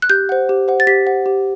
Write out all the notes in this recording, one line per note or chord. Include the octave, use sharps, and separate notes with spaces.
F#6
G4 G6
C5 F#5
G4
C5 F#5
A6
G4 B6
C5 F#5
G4